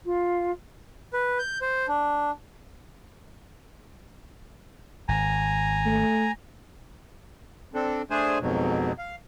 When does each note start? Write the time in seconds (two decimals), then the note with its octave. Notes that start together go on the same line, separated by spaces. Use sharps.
0.05 F4
1.13 B4
1.39 G6
1.62 C5
1.88 D4
5.08 G#1 G#5 A#5
5.85 A3
7.74 C4 D4 A4
8.10 A3 D4 G#4 C5 G#5
8.41 F2 G#2 B2 F#3
8.99 F5